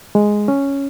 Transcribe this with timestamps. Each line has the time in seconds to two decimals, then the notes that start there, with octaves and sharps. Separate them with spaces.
0.15 G#3
0.48 C#4